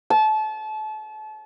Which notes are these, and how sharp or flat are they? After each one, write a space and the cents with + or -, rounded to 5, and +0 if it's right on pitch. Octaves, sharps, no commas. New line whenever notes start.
A5 -30